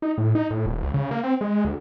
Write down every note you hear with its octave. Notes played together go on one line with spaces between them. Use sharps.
D#4
A2
D#4
A2
D#1
C#2
C#3
A#3
C4
G#3
D2